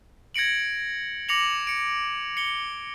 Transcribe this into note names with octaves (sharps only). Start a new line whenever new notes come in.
G#6 A#6 C#7 D7 F#7
D6 A#6 C#7 F7 F#7
C#7 D7
C#7 G7